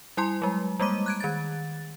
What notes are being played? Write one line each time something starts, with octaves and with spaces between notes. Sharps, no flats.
G3 E4 G#5 C6
F#3 G#3
G3 G#3 A#3 D6 D#7
F#6 G#6 D7
D#3 A6